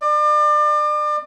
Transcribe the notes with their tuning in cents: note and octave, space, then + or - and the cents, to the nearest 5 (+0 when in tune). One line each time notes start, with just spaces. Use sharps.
D5 +35